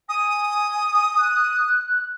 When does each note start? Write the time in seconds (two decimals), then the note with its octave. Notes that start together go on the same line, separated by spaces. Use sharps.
0.09 G#5 D#6
1.18 F#6